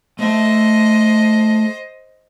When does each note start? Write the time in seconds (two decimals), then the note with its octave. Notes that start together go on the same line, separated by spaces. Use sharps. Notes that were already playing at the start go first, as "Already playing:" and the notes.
0.19 A3 C5 D#5 E5